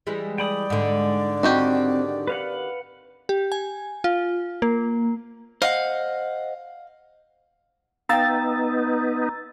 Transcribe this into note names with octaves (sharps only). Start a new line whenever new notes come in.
E3 G3 G#3
D5 G5 B5 D#6
G#2 D3
D#3 C4 F#4 G4
B4 F5 F#5
G4
G#5
F4
A#3
C5 D#5 F5 F#5
B3 D#4 F5 G5 A#5 E6 A6